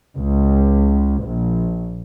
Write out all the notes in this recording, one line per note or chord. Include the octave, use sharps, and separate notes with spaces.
C#2
A#1